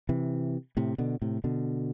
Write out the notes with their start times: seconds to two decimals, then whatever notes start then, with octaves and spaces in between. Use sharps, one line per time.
0.09 C3 E3
0.77 A2 C3
0.98 B2 D3
1.22 A2 C3
1.44 B2 D3